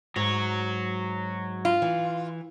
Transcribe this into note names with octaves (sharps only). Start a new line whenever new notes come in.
G#2 F#3 C#5
F4
E3